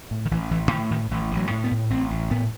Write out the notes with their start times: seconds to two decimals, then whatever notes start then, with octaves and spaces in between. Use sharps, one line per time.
0.11 A2
0.25 D#3
0.31 A1 E3
0.51 A1 E3
0.71 A2 D#3
0.91 A2 D#3
1.11 A1 E3
1.31 A1
1.37 F#3
1.51 A2
1.64 B3
1.71 A2
1.90 A1 C4
2.10 A1
2.31 A2 B3